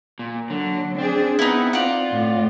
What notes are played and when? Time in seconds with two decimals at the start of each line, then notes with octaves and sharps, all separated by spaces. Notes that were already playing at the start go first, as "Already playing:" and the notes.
0.19 A#2
0.50 D3 F#3
0.98 C4 D4 G#4
1.39 B3 C4 D#4 E4
1.73 F4 D5 F#5
2.12 A2